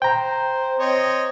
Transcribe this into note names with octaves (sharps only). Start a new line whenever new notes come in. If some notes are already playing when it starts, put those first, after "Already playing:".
C5 G5 A#5
C4 C#5 D#5